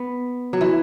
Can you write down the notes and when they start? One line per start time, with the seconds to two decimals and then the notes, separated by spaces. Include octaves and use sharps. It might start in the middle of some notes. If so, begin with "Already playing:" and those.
Already playing: B3
0.53 F#3
0.61 E3